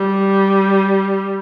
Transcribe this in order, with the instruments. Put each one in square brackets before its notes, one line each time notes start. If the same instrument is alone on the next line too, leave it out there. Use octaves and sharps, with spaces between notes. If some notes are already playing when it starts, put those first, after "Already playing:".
Already playing: [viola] G3